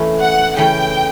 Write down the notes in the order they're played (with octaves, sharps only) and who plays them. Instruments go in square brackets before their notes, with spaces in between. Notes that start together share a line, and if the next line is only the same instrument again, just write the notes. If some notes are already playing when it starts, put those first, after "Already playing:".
Already playing: [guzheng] E3 A3 C#4
[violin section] F#5
[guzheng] C#3 E3 A3 C#4 E4 [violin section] G5